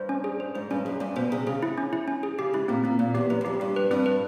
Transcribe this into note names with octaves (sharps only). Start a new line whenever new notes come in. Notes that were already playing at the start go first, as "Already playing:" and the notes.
Already playing: G2 C5
C#4
G#4
C5
G#2 C5
G2 C#4
F#2 G#4
G2 C#4
B2 C5
C3 G#4
C#3 G#4
E4
C#4
E4
C#4
G#4
C#3 G4
G#2 E4
A#2 C4
A#2 C4
A#2 C4
E2 G4
F#2 B4
E2
F2 G4
G2 G4
B4
G2 C4
B4